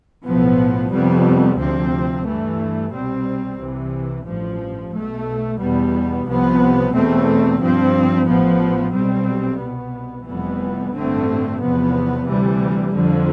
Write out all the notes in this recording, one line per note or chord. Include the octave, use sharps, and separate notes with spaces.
B1 A2 F3 B3
F2 C3 G3 B3
D2 C3 F3 C4
G2 E3 A3
C2 B2 G3 C4
C2 C3 E3
A1 G2 F3
B1 B2 A3
E2 B2 G3 B3
C2 C3 F3 B3
E2 B2 A3 C4
G2 F3 C4
A1 A2 F3 B3
B1 B2 G3 C4
C2 B2 B3
F1 F2 E3 G3 B3
A1 G2 D3 A3 C4
E2 C3 F3 B3
D2 C3 E3 G3
F2 D3 F3